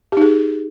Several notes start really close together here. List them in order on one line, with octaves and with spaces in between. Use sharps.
G4 D#4 G#4